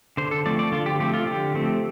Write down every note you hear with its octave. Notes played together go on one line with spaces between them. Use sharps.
D3 C5
A4
F3 A3 C4 D5
D5
D3 F4
G4
F3 A3 C4 G4
F4
D3 G4
F3 A3 C4